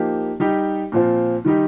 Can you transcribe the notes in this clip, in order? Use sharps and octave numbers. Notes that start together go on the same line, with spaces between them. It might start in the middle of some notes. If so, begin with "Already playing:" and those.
Already playing: F3 A#3 D#4 G4
G3 D#4 G4
A#2 F3 C4 F4
D#3 G3 D#4 G4